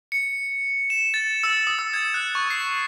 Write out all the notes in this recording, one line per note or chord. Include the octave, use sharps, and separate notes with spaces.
C#7
E7
A6
E6
D#6
E6
G#6
F#6
C#6
C7